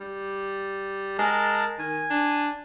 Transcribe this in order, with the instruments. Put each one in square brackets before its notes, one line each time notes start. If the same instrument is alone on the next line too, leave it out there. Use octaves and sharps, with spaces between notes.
[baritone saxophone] G3
[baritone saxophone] G#3 [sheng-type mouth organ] A#4 A5
[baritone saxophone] D#3 [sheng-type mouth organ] G#5
[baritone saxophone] D4